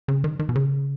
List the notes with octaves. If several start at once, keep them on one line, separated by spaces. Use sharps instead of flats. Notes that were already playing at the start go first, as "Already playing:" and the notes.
C#3
D#3
D#3
B2
C#3